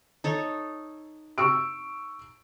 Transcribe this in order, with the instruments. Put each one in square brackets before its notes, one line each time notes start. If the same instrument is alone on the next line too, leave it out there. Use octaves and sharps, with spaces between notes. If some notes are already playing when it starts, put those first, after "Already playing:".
[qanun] D#4 A4 C#5
[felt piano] C#6 E6 D7